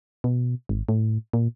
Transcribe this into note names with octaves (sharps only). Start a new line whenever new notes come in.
B2
G#1
A2
A#2